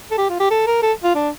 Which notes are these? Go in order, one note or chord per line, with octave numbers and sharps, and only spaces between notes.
A4
G4
F4
G4
A4
A#4
A4
F4
D4